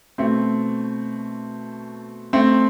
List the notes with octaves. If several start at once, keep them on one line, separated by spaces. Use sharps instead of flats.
B2 A3 C4
A3 C4